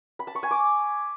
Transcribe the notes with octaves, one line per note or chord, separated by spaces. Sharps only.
B5
A5
C#6
G#5
D6